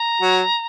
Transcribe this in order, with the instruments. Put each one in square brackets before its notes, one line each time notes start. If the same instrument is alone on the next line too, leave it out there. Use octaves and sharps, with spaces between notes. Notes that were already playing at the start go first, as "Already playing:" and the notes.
Already playing: [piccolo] A#5
[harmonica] F#3 F#4